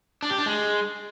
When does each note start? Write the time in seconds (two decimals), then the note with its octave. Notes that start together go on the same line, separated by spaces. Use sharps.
0.23 D4
0.30 G4
0.38 D4
0.46 G#3